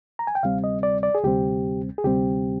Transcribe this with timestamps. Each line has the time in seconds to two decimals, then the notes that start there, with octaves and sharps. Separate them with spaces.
0.19 A#5
0.27 G#5
0.35 G5
0.43 D2 C3 G3 C4 F5
0.64 D#5
0.83 D5
1.03 D5
1.15 G#4
1.24 D2 C3 G3 C4 G4
1.98 G#4
2.04 D2 C3 G3 C4 G4